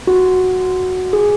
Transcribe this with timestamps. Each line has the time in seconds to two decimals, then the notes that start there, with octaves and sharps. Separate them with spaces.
0.07 F#4
1.13 G#4